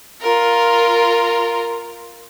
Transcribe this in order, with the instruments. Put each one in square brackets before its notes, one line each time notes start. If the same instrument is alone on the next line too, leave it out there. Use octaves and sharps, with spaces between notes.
[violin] F4 A#4